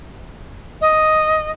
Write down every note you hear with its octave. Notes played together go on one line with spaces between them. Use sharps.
D#5